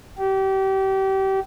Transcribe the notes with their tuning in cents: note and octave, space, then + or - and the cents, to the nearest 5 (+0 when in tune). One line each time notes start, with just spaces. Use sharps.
G4 -30